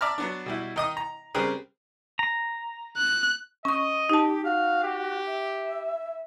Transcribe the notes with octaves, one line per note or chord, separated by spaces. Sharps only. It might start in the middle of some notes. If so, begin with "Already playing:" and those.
D5 E5 A5 A#5 F6
F#3 B3 D4
B2 G3 E4
D#3 D#5 D#6
A#5
C#3 G3 C4 G#4 A#4 B4
A#5
F#6
C#4 D#5 C#6
D#4 G4 A5
F#4 F5
G4
E5